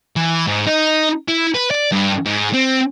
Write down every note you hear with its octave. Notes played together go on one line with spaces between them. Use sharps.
E3
G#2
D#4
E4
B4
D5
G2
G#2
C4